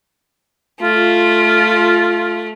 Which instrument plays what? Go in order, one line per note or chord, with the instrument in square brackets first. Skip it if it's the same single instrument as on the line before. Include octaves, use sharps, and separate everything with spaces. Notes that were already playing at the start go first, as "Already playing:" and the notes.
[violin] A3 [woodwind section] F4